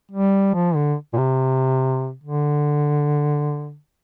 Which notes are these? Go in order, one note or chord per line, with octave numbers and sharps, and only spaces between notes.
G3
F3
D3
A#2
C3
D3